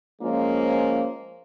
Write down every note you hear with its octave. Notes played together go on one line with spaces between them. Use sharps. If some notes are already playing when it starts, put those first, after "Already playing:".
F3 G#3 A#3 C#4 F4 C5